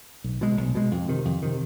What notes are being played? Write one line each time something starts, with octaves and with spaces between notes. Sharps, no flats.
B1
B2 G#3
B1
B2 G#3
F2
C3 D#3
F2
C3 D#3